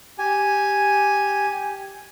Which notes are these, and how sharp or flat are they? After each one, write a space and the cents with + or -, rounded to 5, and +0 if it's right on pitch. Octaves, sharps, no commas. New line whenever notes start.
G4 +0 G#5 +0